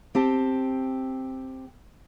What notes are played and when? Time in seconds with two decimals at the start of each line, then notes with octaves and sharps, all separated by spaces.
0.15 C4 G4 A5